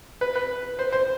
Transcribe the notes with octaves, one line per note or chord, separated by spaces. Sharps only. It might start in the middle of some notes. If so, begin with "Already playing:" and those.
B4
B4
C5
C5